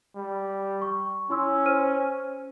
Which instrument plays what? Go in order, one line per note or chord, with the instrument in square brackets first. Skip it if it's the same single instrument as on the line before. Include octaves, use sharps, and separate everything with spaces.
[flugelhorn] G3
[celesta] C#6
[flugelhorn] C#4 [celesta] E4 C6 E6
[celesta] C5 F6 D#7